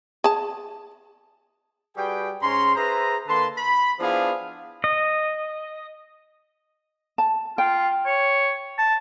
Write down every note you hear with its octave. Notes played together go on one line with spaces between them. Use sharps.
G#4 A5
G3 F#4 G#4 B4 G5
G#2 C#4 A#5 C6
G#4 B4 C5 E5 A#5
D3 A#3 B4 A5 C6
B5
F3 B3 D4 E4 G#4 F5
D#5
A5
F4 G5
C#5
A5